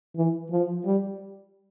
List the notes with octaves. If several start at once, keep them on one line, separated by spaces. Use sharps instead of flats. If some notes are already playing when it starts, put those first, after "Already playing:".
E3
F3
G3